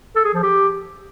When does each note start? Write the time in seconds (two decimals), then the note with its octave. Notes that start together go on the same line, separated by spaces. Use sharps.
0.16 A4
0.25 G#4
0.34 F3
0.43 G4